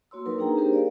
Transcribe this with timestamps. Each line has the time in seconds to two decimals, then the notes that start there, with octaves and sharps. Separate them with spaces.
0.11 A#3 F#4 C#5 C6 E6
0.26 F#3 A#3 D#4 A#4 B4
0.38 A#3 D4 D#4 G#4 G5 A#5
0.57 C4 D4 G4 G#4 A#4 C5
0.72 C#5 D5 F5